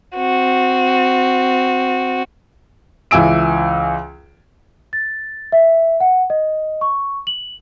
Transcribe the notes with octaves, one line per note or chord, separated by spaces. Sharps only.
C4 F#4
C#2 E3 G#5 E6 D7
A6
E5
F#5
D#5
C#6
F#7